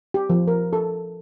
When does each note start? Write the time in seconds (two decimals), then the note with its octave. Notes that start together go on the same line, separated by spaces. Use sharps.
0.14 G4
0.30 F3
0.48 A#4
0.73 A4